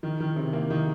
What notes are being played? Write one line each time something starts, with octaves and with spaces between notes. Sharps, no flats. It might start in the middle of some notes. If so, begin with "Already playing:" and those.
D#3
D#3
C3
A#3
D#3